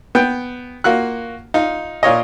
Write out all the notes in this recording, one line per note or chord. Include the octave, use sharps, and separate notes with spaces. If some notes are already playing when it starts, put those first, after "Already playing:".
B3 G5
A#3 F4 F#4 F#6
D#4 F4
A#2 F4 C#5 D#5